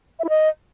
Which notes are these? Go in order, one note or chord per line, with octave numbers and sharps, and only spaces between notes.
E5
E4
D#5